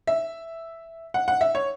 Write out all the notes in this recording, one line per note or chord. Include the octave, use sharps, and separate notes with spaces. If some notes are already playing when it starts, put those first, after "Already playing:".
E5
F#5
F#5
E5
C#5